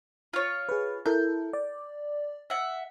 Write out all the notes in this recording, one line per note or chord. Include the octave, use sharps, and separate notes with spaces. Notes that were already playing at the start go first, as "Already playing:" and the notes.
F4 C#5
G#4 B4
E4 A4 A#4 G6
D5
E5 F#5